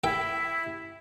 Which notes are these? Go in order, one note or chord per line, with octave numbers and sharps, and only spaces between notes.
E4 A4 G5